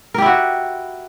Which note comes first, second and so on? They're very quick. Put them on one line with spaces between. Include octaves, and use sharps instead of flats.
A#4 G4 E4 F#4